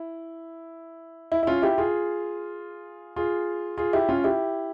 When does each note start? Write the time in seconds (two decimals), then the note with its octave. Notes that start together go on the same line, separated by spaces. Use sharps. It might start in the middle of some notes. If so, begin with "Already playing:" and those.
Already playing: E4
1.32 E4
1.43 E4
1.47 C#4 F4
1.62 E4 G4
1.78 F4 G#4
3.16 F4 G#4
3.78 F4 G#4
3.93 E4 G4
4.09 C#4 F4
4.24 E4 G4